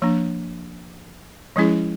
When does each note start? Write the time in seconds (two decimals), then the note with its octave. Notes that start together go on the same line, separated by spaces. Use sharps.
0.02 F3 A#3 D4
1.56 F3 G#3 C#4 E4 G#4